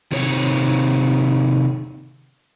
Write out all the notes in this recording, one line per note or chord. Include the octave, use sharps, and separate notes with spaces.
C3 D#3 C4 C#5